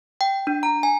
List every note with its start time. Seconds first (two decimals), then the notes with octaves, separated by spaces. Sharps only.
0.21 G5
0.47 D4
0.63 A#5
0.83 G#5